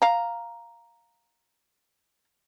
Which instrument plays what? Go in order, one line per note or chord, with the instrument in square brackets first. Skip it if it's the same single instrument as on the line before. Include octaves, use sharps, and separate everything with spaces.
[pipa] F5 A#5